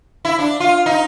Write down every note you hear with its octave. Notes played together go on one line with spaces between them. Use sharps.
E4
D4
F4
D#4